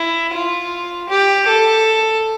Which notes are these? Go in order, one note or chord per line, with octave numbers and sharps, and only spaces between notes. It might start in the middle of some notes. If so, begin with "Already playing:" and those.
Already playing: E4
F4
G4
A4